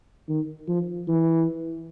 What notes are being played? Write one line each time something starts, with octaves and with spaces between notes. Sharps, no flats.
D#3
F3
E3